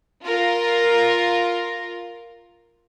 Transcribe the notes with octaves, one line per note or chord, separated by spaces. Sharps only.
F4 A#4